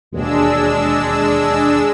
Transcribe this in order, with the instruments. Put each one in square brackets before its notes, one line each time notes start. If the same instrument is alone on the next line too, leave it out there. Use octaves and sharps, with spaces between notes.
[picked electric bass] E1 D#2 [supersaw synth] G#3 D4 E6